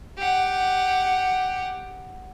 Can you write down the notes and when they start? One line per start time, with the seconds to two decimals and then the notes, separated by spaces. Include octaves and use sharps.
0.18 G4 F#5